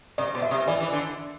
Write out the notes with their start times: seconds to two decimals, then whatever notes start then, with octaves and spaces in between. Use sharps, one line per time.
0.18 C3 D5
0.35 B2
0.42 E5
0.51 C3
0.67 E3 D5
0.80 E3
0.92 D3